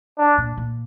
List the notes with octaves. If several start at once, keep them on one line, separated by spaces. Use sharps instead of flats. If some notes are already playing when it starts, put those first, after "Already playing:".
D4
A#2
A#2